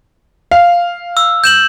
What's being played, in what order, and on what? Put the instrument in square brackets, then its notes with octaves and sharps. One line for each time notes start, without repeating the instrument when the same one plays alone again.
[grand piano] F5
[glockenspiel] E6
G6 E7 F#7